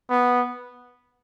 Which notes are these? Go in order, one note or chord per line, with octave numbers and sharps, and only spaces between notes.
B3